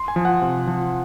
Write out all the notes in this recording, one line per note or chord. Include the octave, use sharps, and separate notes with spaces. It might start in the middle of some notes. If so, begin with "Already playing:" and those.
Already playing: C6
G#5
F3
F#5
C3
F3